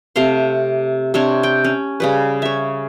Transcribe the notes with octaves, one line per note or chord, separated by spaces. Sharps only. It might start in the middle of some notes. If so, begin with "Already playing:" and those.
C3 A3 F5 C6
C3 C4 D4 C#5
G5
C#4
C#3 G3 B4
C#5 E5